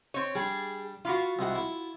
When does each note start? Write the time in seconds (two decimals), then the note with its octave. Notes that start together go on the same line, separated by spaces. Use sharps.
0.14 C4 C#5
0.35 G3 D4 G#4
1.05 F4 F#4 F5 B5 D6
1.39 C2 G#3 F#5
1.55 E4